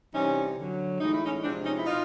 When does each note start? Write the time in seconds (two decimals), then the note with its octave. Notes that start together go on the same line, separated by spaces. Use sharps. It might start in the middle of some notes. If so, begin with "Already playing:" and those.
0.13 C3 E3 G3 C#4 D#4
0.57 D3 F#3
1.00 A2 E3 G#3 D#4
1.13 E4
1.26 C#4 D#4
1.43 C3 F3 G#3 C4 D4
1.64 C#4 D#4
1.78 E4
1.86 B2 D#4 F4